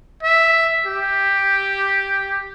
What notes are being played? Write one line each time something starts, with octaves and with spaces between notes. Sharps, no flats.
E5
G4